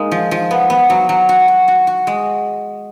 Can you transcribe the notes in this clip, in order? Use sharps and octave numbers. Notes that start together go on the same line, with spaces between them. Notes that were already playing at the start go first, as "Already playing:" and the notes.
Already playing: G#3 A#3 D#4
F3
F3
B3
B3
F#3
F#3
F#4
F#4
F#4
F#4
G#3